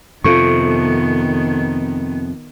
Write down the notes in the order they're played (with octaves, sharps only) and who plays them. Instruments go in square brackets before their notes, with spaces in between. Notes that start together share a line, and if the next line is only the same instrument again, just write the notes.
[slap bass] F2 C3 [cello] D#3 B3 [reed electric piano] F4 A4 C#6